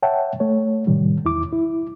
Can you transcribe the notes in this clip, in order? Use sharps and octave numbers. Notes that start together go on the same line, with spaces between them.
C#5 E5 F#5 G5 A5
A3 C#5
A2 C3 D#3 G3
E2 E4 D6
E4